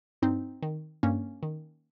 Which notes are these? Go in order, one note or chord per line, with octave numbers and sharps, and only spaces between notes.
G2 C4 D#4
D#3
G2 A#3 C#4
D#3